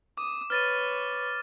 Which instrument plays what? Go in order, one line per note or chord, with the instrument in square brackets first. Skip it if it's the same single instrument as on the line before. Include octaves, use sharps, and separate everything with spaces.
[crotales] D6 [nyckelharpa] D#6
[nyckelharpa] B4 C#5 [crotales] F6 A6 D#7